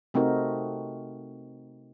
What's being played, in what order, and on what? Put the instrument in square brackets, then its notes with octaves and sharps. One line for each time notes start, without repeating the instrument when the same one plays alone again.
[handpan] C3 A3 C4 D#4 F#4 A#4